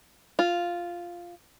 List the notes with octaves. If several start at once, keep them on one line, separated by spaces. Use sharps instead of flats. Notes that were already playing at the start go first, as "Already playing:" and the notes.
F4